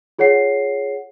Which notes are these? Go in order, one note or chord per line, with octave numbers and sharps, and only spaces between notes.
F4 G#4 C#5 F#5 C7